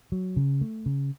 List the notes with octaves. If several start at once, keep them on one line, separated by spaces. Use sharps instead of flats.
F#3
C#3
A3
C#3